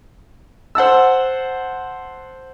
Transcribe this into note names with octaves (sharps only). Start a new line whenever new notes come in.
C5 F#5 A5 E6